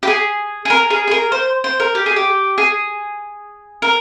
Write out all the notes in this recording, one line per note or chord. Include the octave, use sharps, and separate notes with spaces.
G4
G#4
G#4
A#4
G#4
G#4
A#4
C5
C5
A#4
G4
G#4
G4
G#4
A#4